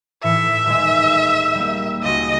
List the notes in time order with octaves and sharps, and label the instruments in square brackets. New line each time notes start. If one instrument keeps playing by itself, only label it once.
[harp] A2 E3 C#7 [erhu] E5
[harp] D#1 G#3
G3 A#3
[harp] C#2 F#4 [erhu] D#5